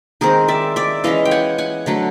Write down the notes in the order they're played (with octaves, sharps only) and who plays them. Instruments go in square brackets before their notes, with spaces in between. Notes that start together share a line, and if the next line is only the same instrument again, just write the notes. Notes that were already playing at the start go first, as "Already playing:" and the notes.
[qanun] D#3 G#3 C4 G#4 A#4
D5 E5
D5 E5
E3 G#3 C#4 D#5 F5
G5
F#5 G#5
F#5 G#5
D3 F#3 A3